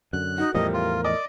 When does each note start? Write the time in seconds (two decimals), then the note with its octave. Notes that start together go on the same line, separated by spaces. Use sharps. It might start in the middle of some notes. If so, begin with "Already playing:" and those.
0.13 F#2 D3 F#6
0.38 D#4 F#4
0.54 E2 A2 F3 G3 A#4 D#5
0.74 F4
1.04 D5 D#5 D6